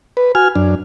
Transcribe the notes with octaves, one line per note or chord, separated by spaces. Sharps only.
B4
F#4 G#5 F6
F#2 D4